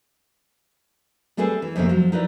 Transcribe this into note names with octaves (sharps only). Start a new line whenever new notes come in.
G3 A3 C4 G#4 A4 B4
E3
F2 G#2 C3 D#3 A3 A#3
F3 F#3
D#4 E4 B4 D5